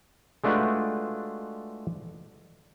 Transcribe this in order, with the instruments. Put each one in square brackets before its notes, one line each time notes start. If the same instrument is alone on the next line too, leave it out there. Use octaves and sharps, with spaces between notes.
[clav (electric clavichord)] G#3 A3 D4 F4 F#4 B4